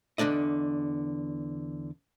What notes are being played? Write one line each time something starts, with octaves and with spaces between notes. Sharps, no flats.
E2 D3 D4 D5 D#5